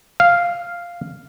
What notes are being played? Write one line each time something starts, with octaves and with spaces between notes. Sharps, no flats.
F5